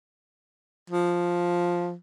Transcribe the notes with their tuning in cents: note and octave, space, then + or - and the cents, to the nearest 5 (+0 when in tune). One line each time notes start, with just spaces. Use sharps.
F3 +5